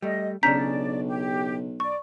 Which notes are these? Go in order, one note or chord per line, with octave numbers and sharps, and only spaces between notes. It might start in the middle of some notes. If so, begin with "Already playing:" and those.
G3 A3 D#5
B1 C#3 C#4 D4 D5 A#5 G6 B6
G4
D5 C#6